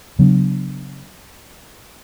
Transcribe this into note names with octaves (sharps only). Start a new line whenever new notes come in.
C#3 F#3 B3 D4